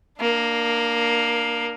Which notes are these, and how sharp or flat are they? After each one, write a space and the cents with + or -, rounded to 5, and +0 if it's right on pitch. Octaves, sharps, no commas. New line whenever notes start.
A#3 +5 D4 +30